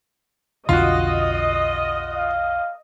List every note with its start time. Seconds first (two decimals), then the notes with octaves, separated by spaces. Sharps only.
0.69 B1 F2 D3 F4 F#4 D#5
2.17 F5